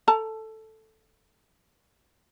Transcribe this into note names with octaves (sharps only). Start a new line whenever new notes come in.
A4 A5 A#5